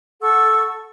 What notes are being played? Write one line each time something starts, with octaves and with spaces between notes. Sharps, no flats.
A4 F#5 C#6 E6